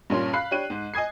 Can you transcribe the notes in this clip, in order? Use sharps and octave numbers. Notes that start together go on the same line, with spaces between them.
G2 A#2 C#4 C6
F5 B5 F#6 C7
D4 G4 C#5 F#6 D#7
G#2
D#5 G#5 D#6 G#6 C7